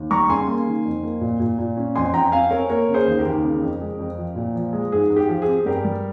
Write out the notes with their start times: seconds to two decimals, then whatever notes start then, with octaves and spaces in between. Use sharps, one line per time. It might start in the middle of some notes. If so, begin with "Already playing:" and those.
Already playing: D#2
0.11 G3 A#5 C#6
0.29 C#3 G#5 C6
0.47 A#3
0.66 D#3
0.85 F2
1.03 A#3
1.21 A#2
1.40 A#2
1.58 A#2
1.77 C#4
1.95 F2 G#5 C6
2.14 F2 G5 A#5
2.32 C4 F5 G#5
2.51 C4 A#4 C#5
2.70 A#3 A#4 C#5
2.88 C#3
2.94 G#4 C5
3.07 D#2
3.19 G4 A#4
3.25 D#2
3.44 C#3
3.62 F2
3.81 G#3
3.99 F2
4.18 F3
4.36 A#2
4.55 F3
4.73 G#3
4.92 G#2 G#4
5.10 G#2
5.16 G4
5.29 F3
5.42 C4 G#4
5.65 G2 G4 A#4
5.84 G3